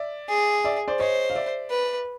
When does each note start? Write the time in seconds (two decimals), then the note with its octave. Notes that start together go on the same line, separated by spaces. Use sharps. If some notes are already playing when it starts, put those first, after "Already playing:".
Already playing: D5 E5
0.29 G#4
0.64 D5 E5
0.88 C5 D5
0.99 C5 C#5 D#5
1.30 F5
1.35 D5 E5
1.70 B4